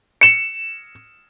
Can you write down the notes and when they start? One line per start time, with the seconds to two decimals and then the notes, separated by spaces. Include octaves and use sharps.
0.21 C#7 E7